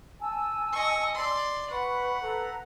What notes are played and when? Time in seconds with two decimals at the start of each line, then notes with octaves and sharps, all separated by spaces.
0.21 G#5 A5 E6
0.72 D#5 C#6
1.15 D5 C6
1.70 B4 F#5 B5 C#6
2.22 A4 B4 A#5